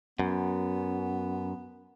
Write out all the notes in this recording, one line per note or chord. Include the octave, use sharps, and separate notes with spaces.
F#2 B3